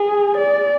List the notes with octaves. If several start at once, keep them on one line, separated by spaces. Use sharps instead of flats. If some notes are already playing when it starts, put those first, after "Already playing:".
Already playing: G#4
D5